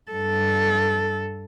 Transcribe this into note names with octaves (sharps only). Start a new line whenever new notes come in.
G2 A4